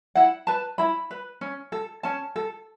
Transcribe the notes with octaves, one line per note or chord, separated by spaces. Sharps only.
E4 F#5
B4 A5
E4 B5
B4
C#4
A4
C#4 A5
A4